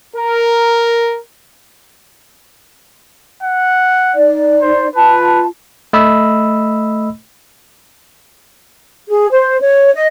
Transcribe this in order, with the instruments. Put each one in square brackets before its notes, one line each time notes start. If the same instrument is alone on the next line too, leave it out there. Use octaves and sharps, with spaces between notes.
[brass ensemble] A#4
[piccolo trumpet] F#5
[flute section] D#4 D5
[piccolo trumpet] C5
[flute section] F4 A5 [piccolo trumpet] B4
[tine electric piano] A3 D#5 B5 E6
[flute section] G#4
C5
C#5
D#5